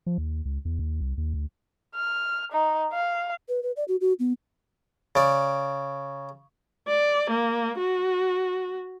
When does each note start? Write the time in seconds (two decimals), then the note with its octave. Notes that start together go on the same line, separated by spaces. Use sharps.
0.06 F3
0.18 D#2
0.45 C#2
0.65 E2
0.79 D#2
1.01 C2
1.18 D#2
1.34 D2
1.96 F6
2.52 D#4
2.93 F5
3.49 B4
3.63 B4
3.77 D5
3.88 F#4
4.01 F#4
4.19 B3
5.15 C#3 D5
6.88 D5
7.30 A#3
7.78 F#4